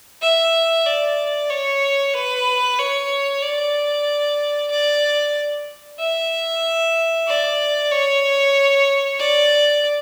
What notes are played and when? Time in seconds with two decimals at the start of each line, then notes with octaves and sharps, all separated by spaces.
0.22 E5
0.86 D5
1.50 C#5
2.14 B4
2.79 C#5
3.42 D5
4.71 D5
5.99 E5
7.27 D5
7.91 C#5
9.19 D5